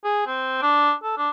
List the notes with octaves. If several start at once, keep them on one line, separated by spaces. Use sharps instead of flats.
G#4
C4
D4
A4
D4